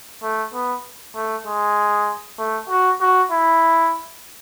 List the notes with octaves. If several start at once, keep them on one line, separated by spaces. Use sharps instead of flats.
A3
B3
A3
G#3
A3
F#4
F#4
E4